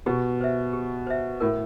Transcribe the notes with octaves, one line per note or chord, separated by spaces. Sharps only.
B2 G4
C5 E5
G4
C5 E5
A2 A#4